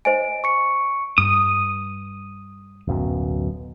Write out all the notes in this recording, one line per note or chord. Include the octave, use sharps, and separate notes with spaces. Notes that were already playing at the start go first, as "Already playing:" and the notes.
C5 D#5 G#5 D7
C#6 C#7
G2 D#6
D1 F#2 B2